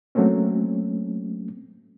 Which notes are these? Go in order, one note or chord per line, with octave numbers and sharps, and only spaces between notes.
F#3 A3 A#3 C4 C#4